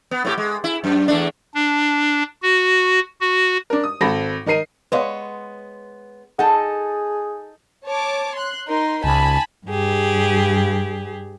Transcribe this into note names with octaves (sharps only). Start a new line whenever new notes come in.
B3
A2 C4 G4
G#3
E4
F#2
E2 A3 D4
D4
F#4
F#4
D4 A#4
D#6
G#1 C4 A4 B5 A#6
D#3 D#4 A#4 C7 D#7
G#3 B3 B4 C#5 D#5 F5
D#4 G#4 A4 F#5
C#5 A5 D6
C6 F#6
D#4 A#4 C6
C#2 G#5 A5 B5
G2 G4 G#4